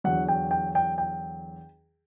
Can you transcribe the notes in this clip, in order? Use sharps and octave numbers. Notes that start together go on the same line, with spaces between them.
E2 D3 F#3 F#5
G5
G5
G5
G5